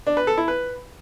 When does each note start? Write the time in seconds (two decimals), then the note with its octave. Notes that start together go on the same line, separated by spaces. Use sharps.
0.07 D4
0.17 B4
0.27 A4
0.38 E4
0.48 B4